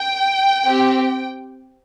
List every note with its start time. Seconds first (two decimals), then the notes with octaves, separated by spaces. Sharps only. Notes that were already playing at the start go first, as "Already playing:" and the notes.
Already playing: G5
0.66 C4 G4